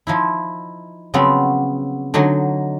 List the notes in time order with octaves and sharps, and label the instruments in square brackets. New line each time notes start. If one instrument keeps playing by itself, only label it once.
[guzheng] F3 D#4 E4
C#3 F3 F#3 B3 C4
D3 F#3 D#4 G#5